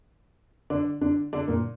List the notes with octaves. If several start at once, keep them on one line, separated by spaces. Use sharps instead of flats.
D3 D4
D3 D4
D3 D4
A#2 A#3